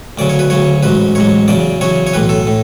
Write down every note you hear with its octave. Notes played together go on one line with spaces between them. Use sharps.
D2 C#3 F#3 D5
C#5
B4
D2 C#3 F#3 C#5
A1 G#2 F#3 B4
A1 G#2 F#3 C#5
E2 C#3 F#3 D5
E2 C#3 F#3 C#5
C#5
B1 A2 E3 B4
A4
A2